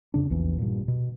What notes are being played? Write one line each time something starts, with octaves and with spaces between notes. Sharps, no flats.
F2 C#3 D4
A#1 E2 E3
G2 A#2
B2